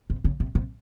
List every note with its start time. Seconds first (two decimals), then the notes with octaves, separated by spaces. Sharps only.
0.10 C3
0.24 C#3
0.40 C3
0.55 C3